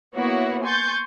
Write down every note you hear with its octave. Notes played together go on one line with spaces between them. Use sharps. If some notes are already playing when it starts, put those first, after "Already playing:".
A#3 B3 E4 F#4 C#5 F#5
G#5 C6 C#6 G6 A6